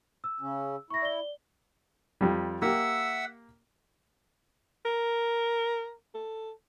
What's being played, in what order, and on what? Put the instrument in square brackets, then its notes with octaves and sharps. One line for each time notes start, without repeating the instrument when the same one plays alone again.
[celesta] E6
[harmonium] C#3 C#4
[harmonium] E4 [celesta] C#6 A#6
[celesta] D5 G7
[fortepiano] F2 G3
[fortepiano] A#3 G4 [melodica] E5 F#5 E6
[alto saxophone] A#4
A4